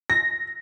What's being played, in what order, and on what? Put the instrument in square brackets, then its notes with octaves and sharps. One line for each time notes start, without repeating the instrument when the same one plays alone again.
[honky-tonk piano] A#6